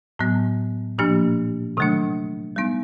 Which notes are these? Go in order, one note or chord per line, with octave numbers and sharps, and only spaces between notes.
A2 F#3 B3
A#2 F3 A#3 D4 G4
C3 D#3 F#3 A3 D4
G3 B3 D#4